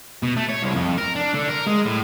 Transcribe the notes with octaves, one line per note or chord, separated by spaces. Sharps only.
B2
A3
C#5
C2
F2
A#4
D4
D3
A#4
G#3
A2